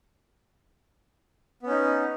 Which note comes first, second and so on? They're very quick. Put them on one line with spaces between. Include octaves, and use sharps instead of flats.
B3 C#4 D#4